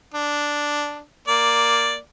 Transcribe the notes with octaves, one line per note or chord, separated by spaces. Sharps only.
D4
A#3 D5